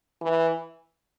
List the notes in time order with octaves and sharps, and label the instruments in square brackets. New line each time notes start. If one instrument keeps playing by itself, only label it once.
[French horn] E3